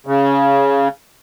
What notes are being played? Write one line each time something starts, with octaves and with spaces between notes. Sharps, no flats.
C#3